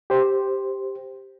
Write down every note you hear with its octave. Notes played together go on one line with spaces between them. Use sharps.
G4 C5